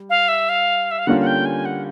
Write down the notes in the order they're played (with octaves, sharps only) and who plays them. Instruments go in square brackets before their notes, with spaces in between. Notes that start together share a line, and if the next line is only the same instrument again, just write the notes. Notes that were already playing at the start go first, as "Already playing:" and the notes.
Already playing: [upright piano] G3
[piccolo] F5
E5
F5
E5
F5
[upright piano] D3 G3 A#3 C#4 F4 [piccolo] F#5
[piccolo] F#5
G5
G#5
F#5